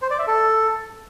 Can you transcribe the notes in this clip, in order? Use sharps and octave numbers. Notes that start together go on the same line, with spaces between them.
C5
D5
E5
A4